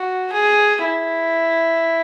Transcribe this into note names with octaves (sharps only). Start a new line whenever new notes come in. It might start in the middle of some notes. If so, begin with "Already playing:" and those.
Already playing: F#4
G#4
E4